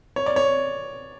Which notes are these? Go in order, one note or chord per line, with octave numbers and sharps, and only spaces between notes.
C#5
D5
C#5